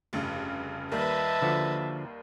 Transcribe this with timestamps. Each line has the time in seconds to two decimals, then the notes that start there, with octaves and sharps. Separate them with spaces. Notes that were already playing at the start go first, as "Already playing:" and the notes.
0.13 F1 G2 C#3
0.92 D#2 D#3 G3 B4 D#5 E5 A5
1.42 D3 F3 F#4